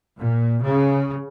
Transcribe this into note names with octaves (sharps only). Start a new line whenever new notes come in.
A#2
C#3